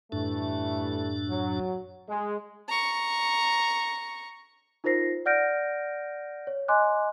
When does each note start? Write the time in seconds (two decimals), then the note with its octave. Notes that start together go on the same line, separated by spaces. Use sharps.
0.12 F#2 A2 E3 G3 A3 D4
1.29 F#3
2.08 G#3
2.68 A#5 C#6
4.84 D#4 F4 A#4 C5 A#6 C7
5.26 D5 F#5 F6 G6 A#6 D7
6.47 C#5
6.68 D#5 G#5 C6 D6 F#6